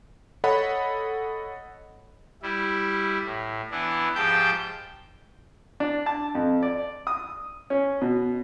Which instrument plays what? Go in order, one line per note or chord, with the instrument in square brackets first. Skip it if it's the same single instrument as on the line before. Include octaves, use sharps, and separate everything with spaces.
[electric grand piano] A4 C#5 D#5 F#5 B5
[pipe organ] G3 E4
A2
E3 B3 D4 E4
G#2 F3 G4 G5 A5 G6
[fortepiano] D4
A5
F2
D5
D#6
C#4
B2